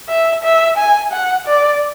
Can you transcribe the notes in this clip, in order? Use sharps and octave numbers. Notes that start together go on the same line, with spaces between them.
E5
E5
G#5
F#5
D5